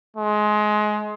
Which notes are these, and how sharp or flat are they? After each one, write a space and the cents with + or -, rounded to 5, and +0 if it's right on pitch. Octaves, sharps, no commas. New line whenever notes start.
G#3 +25